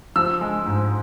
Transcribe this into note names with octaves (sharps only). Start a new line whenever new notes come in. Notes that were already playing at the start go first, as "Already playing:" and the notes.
F3 E6
G#3
G#2